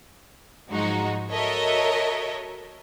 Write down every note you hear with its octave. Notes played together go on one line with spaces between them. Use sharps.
G#2 F3 F#3 G#3 D#4 F#4
F#4 A4 A#4 C#5 D#5 E5